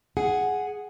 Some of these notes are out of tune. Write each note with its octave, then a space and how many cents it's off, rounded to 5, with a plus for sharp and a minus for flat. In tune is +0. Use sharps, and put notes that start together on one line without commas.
G#4 +5 F#5 +0